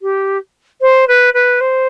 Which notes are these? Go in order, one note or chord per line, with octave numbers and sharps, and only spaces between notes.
G4
C5
B4
B4
C5